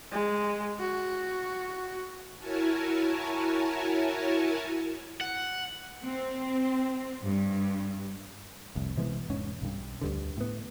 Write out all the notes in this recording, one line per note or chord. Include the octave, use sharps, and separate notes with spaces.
G#3
F#4
E4 F#4 A#4 C#5 G#5 A5
F#5
C4
G2
F1 C2
C3 E3 G#3 B3
E1 G#2 C#4
B1 G2
D2 G2 D3
A2 B3